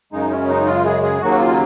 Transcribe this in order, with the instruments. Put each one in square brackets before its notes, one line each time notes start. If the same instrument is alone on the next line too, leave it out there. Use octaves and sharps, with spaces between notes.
[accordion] F#2 C#3 G#3 D#4
C#4
D#4
F4
G#4
G#4
D#2 C#3 F#3 A#3 F#4
F4